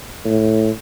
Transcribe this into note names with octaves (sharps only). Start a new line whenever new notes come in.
A2